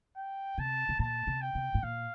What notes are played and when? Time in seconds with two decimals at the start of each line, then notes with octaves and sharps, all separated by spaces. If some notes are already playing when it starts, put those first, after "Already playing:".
0.16 G5
0.58 C3 A5
0.89 C3
0.99 A#2 A5
1.27 C3
1.41 G5
1.55 C3
1.75 A2
1.83 A#2 F5